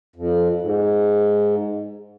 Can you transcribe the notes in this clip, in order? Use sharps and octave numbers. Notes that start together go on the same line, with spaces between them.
F2
G#2